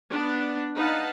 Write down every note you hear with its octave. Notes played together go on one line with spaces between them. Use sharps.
B3 D4
D#4 B4 F5 F#5 A5